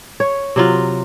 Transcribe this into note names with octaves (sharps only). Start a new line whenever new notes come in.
C#5
C3 F#3 F4